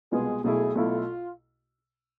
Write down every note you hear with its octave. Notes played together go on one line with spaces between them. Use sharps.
C2 B2 G#3 B3 F4 G#4
B1 B2 A3 E4 G#4
B1 B2 A3 E4 F4